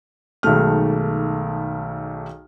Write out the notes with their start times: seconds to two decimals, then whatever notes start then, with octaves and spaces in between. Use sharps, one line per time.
0.43 B1 D#3 G#3 A3 F6